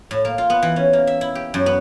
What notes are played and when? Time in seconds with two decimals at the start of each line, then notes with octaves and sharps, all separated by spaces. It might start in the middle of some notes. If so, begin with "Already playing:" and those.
0.11 A2
0.25 A#3
0.38 F4
0.50 B3
0.63 E3
0.76 C#4
0.93 A#3
1.07 E5
1.21 E4
1.35 G4
1.54 F#2
1.66 B3